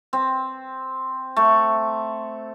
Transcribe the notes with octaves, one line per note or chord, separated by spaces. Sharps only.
C4
A3